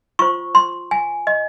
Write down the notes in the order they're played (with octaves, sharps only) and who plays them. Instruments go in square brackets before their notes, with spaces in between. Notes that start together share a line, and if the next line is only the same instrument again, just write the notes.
[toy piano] F4 C5 C#6
C6
G#5
D#5